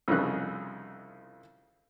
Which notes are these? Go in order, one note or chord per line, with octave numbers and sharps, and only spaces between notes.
C2 F2 C#3 D#4 F#6